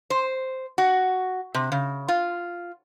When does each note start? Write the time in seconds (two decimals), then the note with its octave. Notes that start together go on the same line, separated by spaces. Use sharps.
0.10 C5
0.78 F#4
1.55 C3
1.72 C#3
2.08 F4